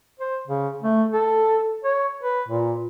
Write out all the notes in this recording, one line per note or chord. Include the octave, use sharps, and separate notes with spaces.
C5
C#3
A3
A4
C#5
B4
A#2